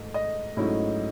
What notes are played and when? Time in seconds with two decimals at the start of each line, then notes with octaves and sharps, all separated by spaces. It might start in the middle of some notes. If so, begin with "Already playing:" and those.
Already playing: G#2 A3
0.14 D#5
0.57 G#2 F#3 A3 C#4 E4